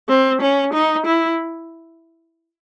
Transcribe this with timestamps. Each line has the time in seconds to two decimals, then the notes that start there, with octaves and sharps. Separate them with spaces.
0.09 C4
0.41 C#4
0.74 D#4
1.06 E4